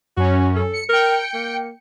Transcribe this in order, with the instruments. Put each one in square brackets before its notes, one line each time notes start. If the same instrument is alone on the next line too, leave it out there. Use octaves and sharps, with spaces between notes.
[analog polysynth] F#2 C#4 [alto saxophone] F#4
[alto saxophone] A4
[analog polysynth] C#7
[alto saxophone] A#4 [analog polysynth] G5 C#7
[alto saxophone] A#3